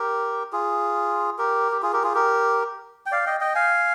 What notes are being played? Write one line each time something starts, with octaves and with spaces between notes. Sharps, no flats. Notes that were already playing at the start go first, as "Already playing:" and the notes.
Already playing: G4 A#4
F4 G#4
G4 A#4
G4
F4 G#4
G4 A#4
F4 G#4
G4 A#4
G5
D5 F5
D#5 G5
D#5 G5
F5 G#5